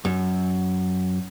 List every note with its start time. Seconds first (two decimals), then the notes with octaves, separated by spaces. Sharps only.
0.05 F#2